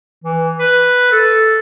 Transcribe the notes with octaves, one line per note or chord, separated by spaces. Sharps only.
E3
B4
A4